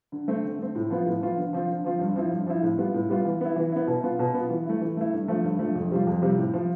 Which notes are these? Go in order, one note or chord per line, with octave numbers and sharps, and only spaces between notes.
D3
A3 C4
D3
A3 C4
A2
F3 B3 F4
A2
F3 B3 F4
D3
F3 C4 F4
D3
F3 C4 F4
G2
F3 C4 E4
G2
F3 C4 E4
A2
G3 B3 F4
A2
G3 B3 F4
E3
B3 E4
E3
B3 E4
B2
B3 F4
B2
B3 F4
E3
A3 E4
E3
A3 E4
G2
D3 F3 A3
G2
D3 F3 A3
F2
C3 G3 C4 F4
F2
C3 G3 C4 F4
A2
F3 C4